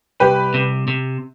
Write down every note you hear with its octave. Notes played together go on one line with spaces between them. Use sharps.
C2 G4 B4
C3
C3